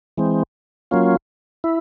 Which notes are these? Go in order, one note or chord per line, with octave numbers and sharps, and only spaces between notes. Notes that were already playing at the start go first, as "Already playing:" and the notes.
E3 G#3 C4
F#3 A#3 C#4 F4
E4